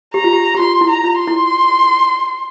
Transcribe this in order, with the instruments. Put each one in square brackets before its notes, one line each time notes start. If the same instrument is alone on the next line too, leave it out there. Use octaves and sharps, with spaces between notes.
[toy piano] G4 [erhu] A#5
[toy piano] F4
G4
G4
[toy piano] F4 [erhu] C6
[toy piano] E4
[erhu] A#5
[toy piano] F4
[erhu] C6
[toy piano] E4